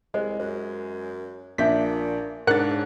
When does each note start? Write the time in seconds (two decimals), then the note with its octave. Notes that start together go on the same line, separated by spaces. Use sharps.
0.14 C2 G#3 C5 D#5
0.40 F#2 C5
1.58 A#1 A#2 D4 D#4 E5 G6 B6
2.47 G#2 C#3 D4 A#4 F#5 F#6 A6